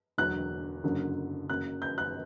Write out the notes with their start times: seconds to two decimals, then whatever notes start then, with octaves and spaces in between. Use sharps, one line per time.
0.18 E1 E2 D3 F#3 F#6
0.84 F#1 F#2 D3 F#3
1.49 F#1 F#2 F#3 F#6
1.82 G6
1.98 F#6